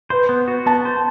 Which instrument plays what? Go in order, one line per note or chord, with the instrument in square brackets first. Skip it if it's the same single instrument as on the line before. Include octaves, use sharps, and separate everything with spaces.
[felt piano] B4 [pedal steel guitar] C5
[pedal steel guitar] B3
F#4
[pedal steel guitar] B3 [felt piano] A5
[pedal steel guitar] C5